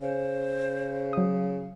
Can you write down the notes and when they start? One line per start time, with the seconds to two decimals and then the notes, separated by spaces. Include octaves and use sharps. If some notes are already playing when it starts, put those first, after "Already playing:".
0.01 C#3 C5
1.13 F#3 D#6